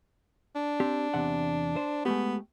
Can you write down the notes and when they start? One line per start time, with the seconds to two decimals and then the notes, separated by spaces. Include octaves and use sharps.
0.55 D4
0.80 C4 G4
1.14 E2 C3 F#5
1.76 C5
2.06 G#3 A3 B3 G4